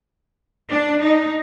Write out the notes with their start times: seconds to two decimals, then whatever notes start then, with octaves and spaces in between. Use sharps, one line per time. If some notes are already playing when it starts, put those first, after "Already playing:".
0.71 D4
1.03 D#4